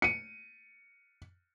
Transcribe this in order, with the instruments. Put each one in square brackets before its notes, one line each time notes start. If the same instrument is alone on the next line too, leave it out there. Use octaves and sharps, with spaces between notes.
[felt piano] C#7 D#7